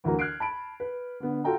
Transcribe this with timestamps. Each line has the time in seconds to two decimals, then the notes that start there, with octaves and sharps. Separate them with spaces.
0.04 D2 E3 F#3 A#4 A#5
0.19 F6 F#6 G#6 C7 D7
0.40 A5 B5 D7
0.80 B4
1.20 D3 B3
1.44 F4 F#4 A4 G5 A#5